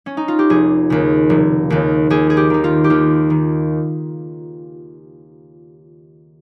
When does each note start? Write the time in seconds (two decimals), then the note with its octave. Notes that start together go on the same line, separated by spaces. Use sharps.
0.06 C#4
0.17 D#4
0.28 F4
0.39 G4
0.50 F1 G#4
0.90 D#2 C#3
1.30 F1
1.70 D#2 C#3
2.10 D#2 G#4
2.30 G#4
2.37 G4
2.50 D#3 D#4
2.64 F4
2.84 G4
2.90 D#2 F4
3.30 D#3